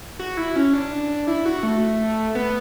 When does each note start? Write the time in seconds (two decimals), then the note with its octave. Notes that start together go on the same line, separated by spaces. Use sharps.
0.20 F#4
0.37 E4
0.56 C#4
0.73 D4
1.27 E4
1.45 F#4
1.63 A3
2.35 B3